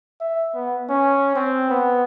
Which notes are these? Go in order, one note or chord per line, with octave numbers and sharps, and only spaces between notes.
E5
B3
C#4
C4
B3